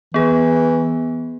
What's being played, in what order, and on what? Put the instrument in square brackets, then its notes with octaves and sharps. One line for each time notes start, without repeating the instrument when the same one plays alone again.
[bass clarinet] E3 [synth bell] B3 G#4